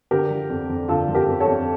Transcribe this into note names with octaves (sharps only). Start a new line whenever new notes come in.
D3 G4 A#4
F3
F2
F2
D3 F4 A4
F3
G4 A#4
F2
A4 C#5
F2